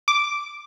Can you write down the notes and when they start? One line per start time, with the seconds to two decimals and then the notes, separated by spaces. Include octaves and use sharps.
0.08 D6